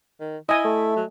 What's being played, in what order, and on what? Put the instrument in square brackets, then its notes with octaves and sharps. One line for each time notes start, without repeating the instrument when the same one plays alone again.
[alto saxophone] D#3
[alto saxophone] E4 [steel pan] D#5 G#5
[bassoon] A3
[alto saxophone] F#3